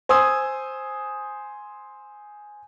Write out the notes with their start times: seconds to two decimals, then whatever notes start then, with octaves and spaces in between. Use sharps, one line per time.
0.09 C5 G#5 C6 D#6 E6